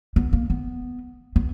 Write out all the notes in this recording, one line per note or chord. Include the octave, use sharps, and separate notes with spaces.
B3
A#3
B3
B3